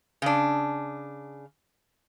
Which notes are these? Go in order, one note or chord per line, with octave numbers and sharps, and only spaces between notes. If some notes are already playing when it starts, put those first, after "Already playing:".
C#3 D4